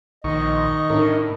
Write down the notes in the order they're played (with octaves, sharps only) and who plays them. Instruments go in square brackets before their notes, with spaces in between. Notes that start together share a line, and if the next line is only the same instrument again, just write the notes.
[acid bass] A#1 [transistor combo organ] D#3 C#6 [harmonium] D#5
[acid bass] A2 [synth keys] D4 D#4 A#4